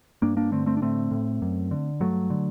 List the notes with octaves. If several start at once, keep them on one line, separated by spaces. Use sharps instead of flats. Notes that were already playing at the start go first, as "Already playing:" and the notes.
G2 A#3 D4
A#3 D4
D3 A3 C4
A3 C4
D4
A2 A3 C4
A2
F#2
D3
G2 F#3 A3
D3